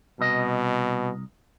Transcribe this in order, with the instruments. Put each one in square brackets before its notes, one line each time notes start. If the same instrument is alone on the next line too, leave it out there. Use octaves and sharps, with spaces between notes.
[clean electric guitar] C2 D#5 [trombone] B2